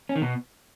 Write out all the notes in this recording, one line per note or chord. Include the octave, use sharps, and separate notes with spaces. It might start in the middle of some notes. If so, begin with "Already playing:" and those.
C#4
D#3
B2